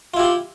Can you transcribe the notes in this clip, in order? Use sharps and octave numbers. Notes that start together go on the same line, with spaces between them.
E4 F4 G4